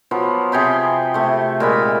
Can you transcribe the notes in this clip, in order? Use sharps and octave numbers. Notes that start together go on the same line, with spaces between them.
F3 F#3 B3
C3 G#4 G5 B5
C3 A3
A#2 G#3 B5